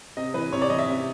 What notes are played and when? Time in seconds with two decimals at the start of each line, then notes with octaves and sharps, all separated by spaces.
0.17 C3 D#5
0.34 E3 B4
0.52 C3 C#5
0.62 D5
0.70 E3 D#5
0.78 E5
0.88 C3